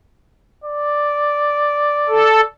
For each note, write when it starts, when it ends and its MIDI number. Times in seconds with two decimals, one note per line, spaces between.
0.64 2.53 74
2.09 2.41 69